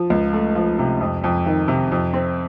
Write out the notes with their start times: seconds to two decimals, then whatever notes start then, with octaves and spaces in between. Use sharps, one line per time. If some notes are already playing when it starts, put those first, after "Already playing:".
Already playing: F3
0.10 C#2
0.33 A3
0.55 F3
0.79 C3
1.00 F2
1.24 F2
1.46 D#3
1.68 C3
1.92 F2
2.14 C4